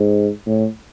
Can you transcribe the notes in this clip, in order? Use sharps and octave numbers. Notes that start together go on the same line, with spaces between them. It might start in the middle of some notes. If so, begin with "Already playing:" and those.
Already playing: G#2
A2